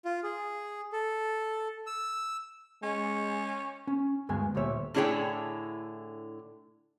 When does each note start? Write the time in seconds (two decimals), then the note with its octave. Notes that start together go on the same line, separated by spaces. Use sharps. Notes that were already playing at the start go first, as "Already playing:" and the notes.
0.05 F4
0.24 G#4
0.93 A4
1.87 E6
2.83 G#3 C#4
3.87 C#4
4.29 D2 G2 G#3 B3 G#5
4.55 D2 A#2 G3 C#5 E5
4.94 A2 D3 E4 G#4 C#5 G5